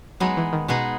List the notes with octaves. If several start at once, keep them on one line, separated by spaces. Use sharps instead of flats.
F#3 G#3 B3 D#4 G#4
E3
D#3
B2 G#3 B3 D#4 G#4